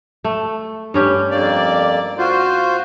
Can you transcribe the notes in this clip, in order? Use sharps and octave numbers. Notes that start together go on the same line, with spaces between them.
A3
G2 C#4 G4
F2 A#3 D5
F4 F#4 C5